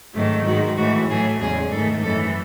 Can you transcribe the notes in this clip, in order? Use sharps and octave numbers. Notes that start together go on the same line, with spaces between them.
G#2 D#3 F#3 A3
G#2 D#3 G#3 F#4
A2 E3 A3 F#4
A2 F#3 A3 G#4
E2 C#3 G#3 G#4
G#2 D#3 A3 A4
F#2 E3 A3 A4